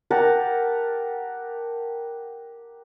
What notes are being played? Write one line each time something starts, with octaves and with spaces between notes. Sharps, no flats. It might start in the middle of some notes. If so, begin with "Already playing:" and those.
G4 A#4 F#5 A5